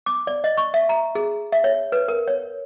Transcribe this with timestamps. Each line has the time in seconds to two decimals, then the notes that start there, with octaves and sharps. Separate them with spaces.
0.06 D6
0.27 D5
0.44 D#5
0.57 C#6
0.74 E5
0.89 A#5
1.15 G#4
1.52 E5
1.64 C#5
1.92 B4
2.08 A#4
2.28 C#5